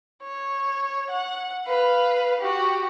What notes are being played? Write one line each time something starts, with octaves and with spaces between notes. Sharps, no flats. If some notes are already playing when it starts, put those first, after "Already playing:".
C#5
F#5
B4 F5
F#4 G4